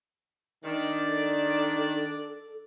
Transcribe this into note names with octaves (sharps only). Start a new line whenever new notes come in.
D#3 D4 D5
A4